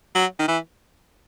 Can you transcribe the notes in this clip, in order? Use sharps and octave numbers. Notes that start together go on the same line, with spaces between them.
F#3
D#3
E3